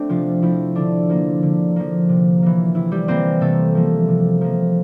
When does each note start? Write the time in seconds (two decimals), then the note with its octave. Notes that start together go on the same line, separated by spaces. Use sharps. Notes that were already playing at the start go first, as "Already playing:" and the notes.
Already playing: A3 C4 D4
0.09 C3 F3 F4
0.42 F3 A3 C4 E4
0.76 D3 D4
1.09 F3 A#3
1.42 D3
1.76 F3 A#3
2.09 C3
2.42 E3 A#3
2.74 C3 E4
2.92 G3 G4
3.08 E3 A#3 C4 C5
3.41 C3 A3 A4
3.75 F3 A#3
4.08 C3
4.41 F3 A#3